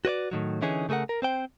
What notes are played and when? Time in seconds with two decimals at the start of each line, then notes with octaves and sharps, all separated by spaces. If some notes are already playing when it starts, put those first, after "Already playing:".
0.05 F#4 B4 C#5 D5
0.31 A2 D#3 F#3
0.62 D3 E3 C#4 D#4 G#4
0.89 C#3 A3 G#4 A#4 F#5
1.09 A#4
1.22 C4 C5 G5